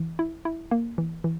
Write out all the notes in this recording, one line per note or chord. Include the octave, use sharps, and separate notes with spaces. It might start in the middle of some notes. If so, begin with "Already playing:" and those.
Already playing: E3
E4
E4
A#3
E3
E3